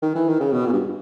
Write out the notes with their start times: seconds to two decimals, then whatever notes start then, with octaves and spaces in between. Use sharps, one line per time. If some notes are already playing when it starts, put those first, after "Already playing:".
0.02 D#3
0.15 E3
0.28 D#3
0.40 C#3
0.53 B2
0.66 A#2
0.73 G2